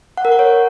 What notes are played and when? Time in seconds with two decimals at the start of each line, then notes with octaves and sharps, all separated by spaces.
0.17 F#5
0.25 A#4
0.32 F#5
0.39 C#5